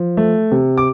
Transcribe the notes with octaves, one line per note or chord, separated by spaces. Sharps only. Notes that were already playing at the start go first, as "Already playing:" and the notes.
Already playing: F3
A3
C3
D6